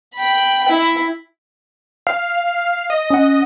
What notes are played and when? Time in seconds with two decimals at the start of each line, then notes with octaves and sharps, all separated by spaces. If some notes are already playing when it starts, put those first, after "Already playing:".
0.15 G5 B5
0.69 E4
2.07 F5
2.90 D#5
3.10 C#4 F#5